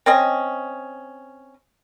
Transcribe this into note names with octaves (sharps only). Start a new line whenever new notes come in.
C4 C#4 D#5